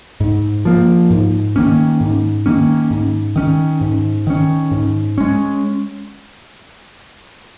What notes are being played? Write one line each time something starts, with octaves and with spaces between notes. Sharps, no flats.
G#2
F3 A#3
G#2
D#3 A#3 C#4
G#2
D#3 A#3 C#4
G#2
D#3 C#4
G#2
D#3 C#4
G#2
G#3 C#4